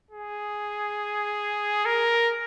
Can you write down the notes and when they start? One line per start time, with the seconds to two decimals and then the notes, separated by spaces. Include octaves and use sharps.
0.11 G#4
1.85 A#4